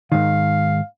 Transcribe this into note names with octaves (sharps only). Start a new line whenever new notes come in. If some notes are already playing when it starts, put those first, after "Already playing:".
G#2 D#3 F5